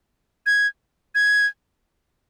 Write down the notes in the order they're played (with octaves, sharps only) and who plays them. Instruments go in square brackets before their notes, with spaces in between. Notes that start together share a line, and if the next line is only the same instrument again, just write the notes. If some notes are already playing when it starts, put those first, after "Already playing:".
[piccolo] G#6
G#6